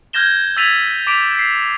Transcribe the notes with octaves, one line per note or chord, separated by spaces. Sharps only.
F6 G6 G#6 A#6 E7 G7
E6 G#6 A6 B6 D#7 F7
D6 B6 D7 F7
B6 C7